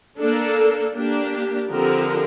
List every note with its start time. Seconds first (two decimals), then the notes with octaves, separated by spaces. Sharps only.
0.18 A#3 D4 A4
0.95 A#3 D4 G4
1.71 D3 F3 C4 G4 A#4